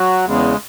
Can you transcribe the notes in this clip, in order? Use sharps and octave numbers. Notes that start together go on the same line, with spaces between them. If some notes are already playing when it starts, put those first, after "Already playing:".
Already playing: F#3 F#4
E2 C#3 G#3